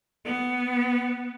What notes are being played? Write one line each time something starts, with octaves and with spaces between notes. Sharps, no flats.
B3